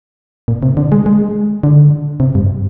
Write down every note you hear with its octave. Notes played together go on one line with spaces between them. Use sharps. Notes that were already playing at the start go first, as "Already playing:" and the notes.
A#2
C3
D3
G#3
G#3
D3
C3
G2